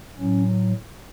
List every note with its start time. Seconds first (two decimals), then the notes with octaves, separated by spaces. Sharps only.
0.18 A2 F#3 C#4